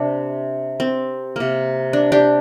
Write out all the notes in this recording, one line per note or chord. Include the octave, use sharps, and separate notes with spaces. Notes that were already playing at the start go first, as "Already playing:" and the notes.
Already playing: C3 D4
C4
C3 A#3
D4
D4 G4